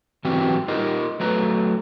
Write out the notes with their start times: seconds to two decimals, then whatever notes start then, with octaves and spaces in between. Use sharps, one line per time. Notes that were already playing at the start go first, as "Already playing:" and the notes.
0.24 G#2 E3 F#3 C4 F#4 G4
0.68 D#4 F4 G4 A#4 D#5
1.20 F#3 A3 B4 A#5